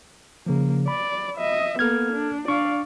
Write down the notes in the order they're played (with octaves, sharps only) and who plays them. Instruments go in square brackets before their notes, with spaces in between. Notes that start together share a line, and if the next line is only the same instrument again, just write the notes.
[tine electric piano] C#3 F3 [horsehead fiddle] A#3
[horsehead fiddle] D5 [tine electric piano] B5
[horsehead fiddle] D#5 E5
[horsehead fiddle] A#3 B3 [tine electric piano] A4 F6 G#6
[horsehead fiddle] D4
[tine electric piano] D4 C#6 [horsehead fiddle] D5 F5